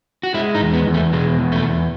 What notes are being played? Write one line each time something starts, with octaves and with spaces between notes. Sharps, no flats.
F#4
G#3 E4
D#4
E2
B3
E2
A3
B2 G#3
E2
A3
E2